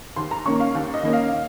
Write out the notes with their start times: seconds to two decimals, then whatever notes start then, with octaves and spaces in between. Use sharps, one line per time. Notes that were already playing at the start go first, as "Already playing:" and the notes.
0.16 D#2 C6
0.31 A#5
0.46 D#3 A#3 C#4 C#6
0.60 F5
0.75 D#2
0.94 D#5
1.03 D#3 A#3 C#4
1.13 F5